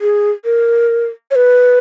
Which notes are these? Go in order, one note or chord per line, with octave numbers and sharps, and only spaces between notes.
G#4
A#4
C#5
B4